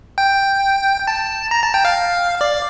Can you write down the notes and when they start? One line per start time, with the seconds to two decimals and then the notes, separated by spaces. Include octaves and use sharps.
0.18 G5
1.08 A5
1.51 A#5
1.63 A5
1.74 G5
1.85 F5
2.41 D5